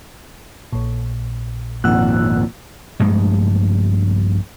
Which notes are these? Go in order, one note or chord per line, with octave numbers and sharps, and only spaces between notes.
A#1 A#2
G#1 F2 A#2 F#5 E6 F#6
A#1 G2 G#3 A3